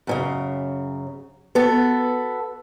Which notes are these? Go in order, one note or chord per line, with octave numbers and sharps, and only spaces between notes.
F#2 A#2 C#3
B3 F#4 A4